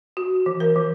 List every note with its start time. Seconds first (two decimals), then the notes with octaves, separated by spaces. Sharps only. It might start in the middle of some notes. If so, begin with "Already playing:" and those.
0.17 F#4
0.46 E3
0.60 A#4
0.76 E3